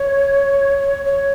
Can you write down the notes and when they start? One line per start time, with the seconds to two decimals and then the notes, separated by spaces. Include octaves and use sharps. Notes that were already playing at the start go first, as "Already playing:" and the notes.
Already playing: C#5
1.05 C#5